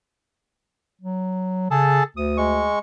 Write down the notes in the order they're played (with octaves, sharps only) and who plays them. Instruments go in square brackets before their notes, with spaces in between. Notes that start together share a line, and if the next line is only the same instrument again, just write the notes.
[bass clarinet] F#3
[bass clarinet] C#3 [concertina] G#4 A4 A5
[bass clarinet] D2 [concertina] D#6
[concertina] G#3 C#6